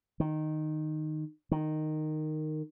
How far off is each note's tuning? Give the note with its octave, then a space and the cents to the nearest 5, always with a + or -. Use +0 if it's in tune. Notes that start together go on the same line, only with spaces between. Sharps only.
D#3 -10
D#3 -10